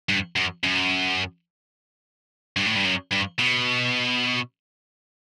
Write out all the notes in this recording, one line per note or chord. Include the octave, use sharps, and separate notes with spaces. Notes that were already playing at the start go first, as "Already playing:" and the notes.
G2
F#2
F#2
G2
A2
G2
F#2
G2
B2